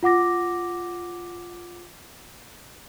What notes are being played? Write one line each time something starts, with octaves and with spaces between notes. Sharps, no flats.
F4 F#5 D6 A#6